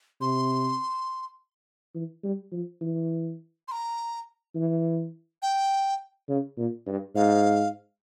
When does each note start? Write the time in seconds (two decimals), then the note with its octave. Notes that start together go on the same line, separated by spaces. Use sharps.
0.21 C3 C6
1.95 E3
2.24 G3
2.52 F3
2.81 E3
3.68 C6
3.72 A#5
4.55 E3
5.42 G5
6.28 C#3
6.57 A#2
6.87 G2
7.15 G#2 F5